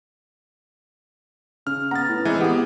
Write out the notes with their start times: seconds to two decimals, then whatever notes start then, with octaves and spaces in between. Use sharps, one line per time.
1.67 C#3 F6
1.91 B3 A#5 A6
2.09 A2
2.25 E3 G#3 C4
2.41 B3 G4 G#4